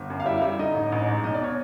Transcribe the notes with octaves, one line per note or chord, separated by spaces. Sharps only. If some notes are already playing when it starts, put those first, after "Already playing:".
Already playing: G1
F#2
F5
G3 E4 E5
F5
G3 E4 E5
D3 D#4 D#5
A1
A1
G#2
B1 D#5
D5
B2 C#5